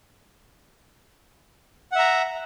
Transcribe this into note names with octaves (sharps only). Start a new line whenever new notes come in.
E5 F#5 A#5